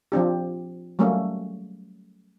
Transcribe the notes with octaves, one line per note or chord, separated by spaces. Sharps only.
F3 C4 D4 G4
F#3 G3 A3 A#3 C#4